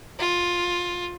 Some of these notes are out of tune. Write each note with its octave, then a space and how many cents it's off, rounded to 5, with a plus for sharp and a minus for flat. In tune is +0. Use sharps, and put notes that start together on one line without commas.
F4 +15